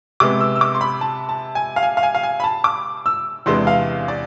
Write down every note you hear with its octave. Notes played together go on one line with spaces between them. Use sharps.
C3 G#3 B3 D6
E6
E6
D6
C6
B5
A5
A5
G#5
F5
G#5
F5
G#5
F5
G#5
B5
A5
D6
E6
E2 C3 G#3 B3 D4 C6
F5
D5